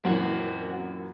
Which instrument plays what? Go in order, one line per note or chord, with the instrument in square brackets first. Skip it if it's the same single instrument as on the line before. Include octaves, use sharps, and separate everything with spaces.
[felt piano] F#2 A#2 E3 [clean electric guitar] C4 F#4